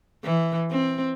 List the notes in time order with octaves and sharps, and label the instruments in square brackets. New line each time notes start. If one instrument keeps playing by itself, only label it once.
[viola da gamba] E3
C4